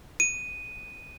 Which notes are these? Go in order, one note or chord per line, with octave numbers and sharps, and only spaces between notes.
D#7